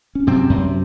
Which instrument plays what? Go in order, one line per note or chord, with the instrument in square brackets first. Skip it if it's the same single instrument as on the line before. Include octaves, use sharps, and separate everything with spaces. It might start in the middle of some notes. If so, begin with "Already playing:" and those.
[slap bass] C#4
F#2 C3 C4
F#2